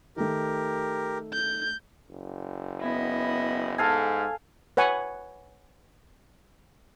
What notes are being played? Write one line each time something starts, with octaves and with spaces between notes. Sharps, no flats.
D#3 A3 G4 A#4
G6
F#1
B3 E4 D#5
G#2 A4 F5 G#5
B4 C#5 F#5 G#5